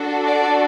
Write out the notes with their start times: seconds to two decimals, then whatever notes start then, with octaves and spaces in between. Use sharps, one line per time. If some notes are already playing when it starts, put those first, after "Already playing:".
Already playing: D4 F#4 A4
0.25 D5